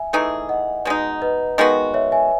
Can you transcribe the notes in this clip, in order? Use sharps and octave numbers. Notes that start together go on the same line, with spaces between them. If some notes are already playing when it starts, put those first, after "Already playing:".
Already playing: E5 G#5
E3 A3 D#4 G#4
D#5 F#5
B2 G#3 D#4
B4 D#5
D#3 G#3 B3 F#4
C#5 E5
E5 G#5